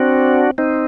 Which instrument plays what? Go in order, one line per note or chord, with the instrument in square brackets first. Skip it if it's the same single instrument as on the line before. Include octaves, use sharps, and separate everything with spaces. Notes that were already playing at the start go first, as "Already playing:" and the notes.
Already playing: [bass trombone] C4 [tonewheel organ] D4 F#4
[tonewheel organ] C4 D#4